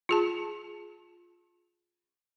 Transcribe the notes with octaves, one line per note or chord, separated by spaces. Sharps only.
F4 G#4 A5